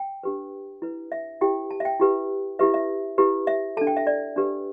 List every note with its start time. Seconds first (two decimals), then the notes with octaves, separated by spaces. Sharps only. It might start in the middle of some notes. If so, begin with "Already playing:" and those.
Already playing: G5
0.23 D4 G4 B4
0.82 E4 B4
1.12 E5
1.41 E4 G4 B4 G5
1.70 A5
1.80 E5
1.85 G5
2.00 E4 G4 B4
2.59 E4 G4 B4 E5
2.74 E5
3.18 E4 G4 B4
3.47 E5
3.77 A4 A5
3.81 D4
3.87 G5
3.97 E5
4.07 D5
4.36 D4 G4 B4